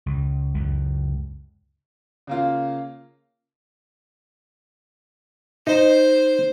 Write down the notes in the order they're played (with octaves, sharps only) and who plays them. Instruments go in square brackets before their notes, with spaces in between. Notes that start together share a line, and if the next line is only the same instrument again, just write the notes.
[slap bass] C#2
C#2 F#2
[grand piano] C#3 A#3 F4
[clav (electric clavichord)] D#4 [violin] C5